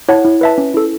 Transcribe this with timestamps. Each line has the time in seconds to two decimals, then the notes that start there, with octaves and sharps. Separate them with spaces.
0.08 E4 C#5 F#5 A5
0.25 E4
0.41 B4 E5 A5
0.58 C#4
0.74 E4 A4